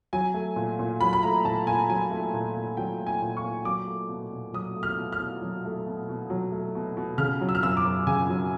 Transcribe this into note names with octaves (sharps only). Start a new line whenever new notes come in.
F#3 G#5
A3
A#2
A#2
F#3 B5
B5
A3 A#5
A#2 A5
A#2 G#5
F#3 G#5
A3
A#2
A#2
F#3 G5
A3
G#5
A#2
C#6
A#2
F#3 D6
A3
B2
B2
F#3 D#6
A3
F6
B2
F6
B2
F#3
A3
B2
B2
F#3
A3
B2
B2
C#3 F6
F#3
E6
F6
F#2 E6
D6
F#2
C#3 G#5
F#3